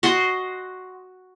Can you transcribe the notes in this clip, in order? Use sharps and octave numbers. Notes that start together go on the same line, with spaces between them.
F#4 D#5 F#5 C6